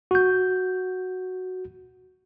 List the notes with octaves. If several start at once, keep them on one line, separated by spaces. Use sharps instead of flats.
F#4 G6